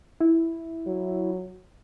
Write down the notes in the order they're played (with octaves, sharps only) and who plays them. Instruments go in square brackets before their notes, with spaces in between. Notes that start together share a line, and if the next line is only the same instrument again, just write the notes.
[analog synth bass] E4
[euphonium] F#3